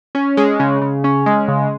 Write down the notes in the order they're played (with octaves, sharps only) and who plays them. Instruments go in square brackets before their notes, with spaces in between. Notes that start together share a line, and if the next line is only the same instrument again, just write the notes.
[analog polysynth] C#4
G#3
C#3
C#3
C#4
G#3
C#3